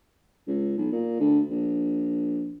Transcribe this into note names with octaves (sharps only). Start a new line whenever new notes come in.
C#2
B1
A#2
D2
A#1